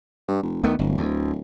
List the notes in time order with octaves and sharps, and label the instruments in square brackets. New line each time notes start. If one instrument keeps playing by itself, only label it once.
[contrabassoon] G2
F1
[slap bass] D2 A3 B3 [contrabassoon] D#3
[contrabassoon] D1 [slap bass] G1
[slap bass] D2